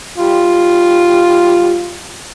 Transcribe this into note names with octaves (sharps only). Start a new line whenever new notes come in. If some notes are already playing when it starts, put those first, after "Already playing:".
G3 F4